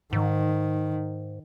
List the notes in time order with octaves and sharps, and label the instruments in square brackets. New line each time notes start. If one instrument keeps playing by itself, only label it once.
[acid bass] G#2 [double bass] D#3